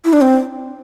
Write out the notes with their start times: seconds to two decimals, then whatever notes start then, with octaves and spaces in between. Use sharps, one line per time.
0.05 E4
0.13 D4
0.21 C4